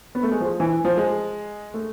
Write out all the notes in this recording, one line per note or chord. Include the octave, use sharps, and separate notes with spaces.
B3
A3
G#3
F3
E3
F3
G#3
A3